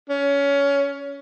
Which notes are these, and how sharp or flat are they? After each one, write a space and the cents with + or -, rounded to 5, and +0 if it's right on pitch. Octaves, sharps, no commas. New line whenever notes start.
C#4 +20